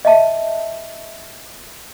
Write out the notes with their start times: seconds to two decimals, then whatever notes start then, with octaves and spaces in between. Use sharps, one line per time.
0.05 D#5 E5 A5